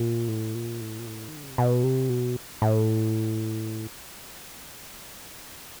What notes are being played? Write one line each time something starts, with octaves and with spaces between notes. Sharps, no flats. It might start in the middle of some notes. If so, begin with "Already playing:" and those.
Already playing: A#2
A2
A#2
A2
A#2
A2
D#3
D3
C#3
C3
B2
C3
B2
A2